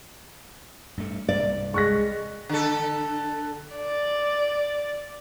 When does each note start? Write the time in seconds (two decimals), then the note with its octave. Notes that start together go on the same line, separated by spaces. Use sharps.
0.97 G2 A3
1.29 C2 G2 D5
1.74 G#3 C#6 F#6 A#6
2.49 D3 A4
3.75 D5